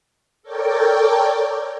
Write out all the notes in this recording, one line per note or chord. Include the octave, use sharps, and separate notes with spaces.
A4 A#4 C#5 D5 G5